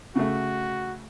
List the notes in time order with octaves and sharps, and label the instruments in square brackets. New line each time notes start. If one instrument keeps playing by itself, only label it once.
[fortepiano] C#3 A3 [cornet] F#4